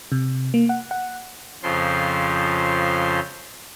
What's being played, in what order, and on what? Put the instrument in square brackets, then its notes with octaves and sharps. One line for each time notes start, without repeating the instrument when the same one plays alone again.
[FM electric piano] C3
A#3
F#5
F#5
[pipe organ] F2 C#3 F3 C6